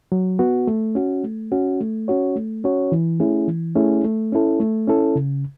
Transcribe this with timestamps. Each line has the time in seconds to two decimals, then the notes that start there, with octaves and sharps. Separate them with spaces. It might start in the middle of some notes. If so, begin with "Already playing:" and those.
0.12 F#3
0.39 B3 F#4
0.67 A3
0.95 C#4 F#4
1.24 A3
1.52 C#4 F#4
1.80 A3
2.08 C#4 F#4 C#5
2.36 A3
2.64 C#4 F#4 C#5
2.92 E3
3.20 A3 C#4 E4 G#4
3.47 E3
3.76 A3 C#4 E4 G#4
4.04 A3
4.32 C#4 E4 A4
4.60 A3
4.87 C#4 E4 A4
5.15 C#3